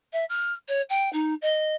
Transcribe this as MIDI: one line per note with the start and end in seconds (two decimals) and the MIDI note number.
0.13 0.24 76
0.29 0.53 89
0.68 0.82 73
0.89 1.11 79
1.13 1.34 63
1.41 1.75 75